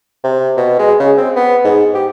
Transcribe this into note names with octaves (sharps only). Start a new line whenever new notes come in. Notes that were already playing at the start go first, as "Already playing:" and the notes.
C3
B2
G#3
C#3
C4
B3
G#2
G4